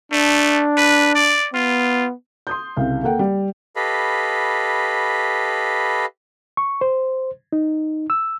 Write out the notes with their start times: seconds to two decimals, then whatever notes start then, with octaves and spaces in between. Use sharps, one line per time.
0.12 A3 D4
0.77 B4
1.15 D5
1.54 B3 F4
2.47 C6 D#6 G6
2.76 C2 C#3 F5
3.03 A#3 A4 A#4 F#5 G5
3.19 G3
3.76 G4 A4 B4 D#5 F5 B5
6.57 C#6
6.81 C5
7.53 D#4
8.10 E6